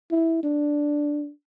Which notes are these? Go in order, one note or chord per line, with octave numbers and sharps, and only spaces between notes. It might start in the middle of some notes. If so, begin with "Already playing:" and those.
E4
D4